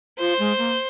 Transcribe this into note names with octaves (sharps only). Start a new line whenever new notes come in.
F4 C5
G#3
A#3